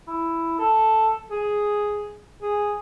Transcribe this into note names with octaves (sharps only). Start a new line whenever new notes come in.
E4
A4
G#4
G#4